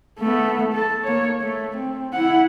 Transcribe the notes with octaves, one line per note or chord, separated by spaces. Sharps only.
A3 B3
A4 A5
A#3 C#5
A3
C4
E4 F#5